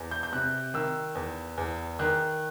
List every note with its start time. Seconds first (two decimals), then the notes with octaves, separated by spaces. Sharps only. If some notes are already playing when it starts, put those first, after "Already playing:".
Already playing: E2
0.11 G6
0.23 G6
0.33 C3 F#6
0.74 D#3 E6
1.15 E2
1.58 E2
1.99 D#3 F#6